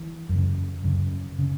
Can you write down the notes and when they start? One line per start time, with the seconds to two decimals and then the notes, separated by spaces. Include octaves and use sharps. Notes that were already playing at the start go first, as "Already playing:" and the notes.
Already playing: E3
0.29 F#2
0.35 C#3
0.84 F#2 C#3
1.39 C#3